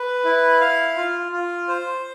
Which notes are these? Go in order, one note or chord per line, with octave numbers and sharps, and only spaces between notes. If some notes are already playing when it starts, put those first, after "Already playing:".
Already playing: B4
E4
F5
F4
F4
C5